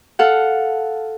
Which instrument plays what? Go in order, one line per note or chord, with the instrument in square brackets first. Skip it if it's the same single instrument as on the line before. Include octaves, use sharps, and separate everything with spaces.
[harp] A4 F5 F#5